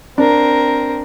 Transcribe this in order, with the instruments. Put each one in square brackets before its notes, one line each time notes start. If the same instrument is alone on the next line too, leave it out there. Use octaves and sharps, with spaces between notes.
[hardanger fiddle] C4 A#4 [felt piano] D4